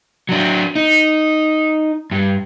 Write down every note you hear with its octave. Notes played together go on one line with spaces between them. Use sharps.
F#3 D4
D#4
G2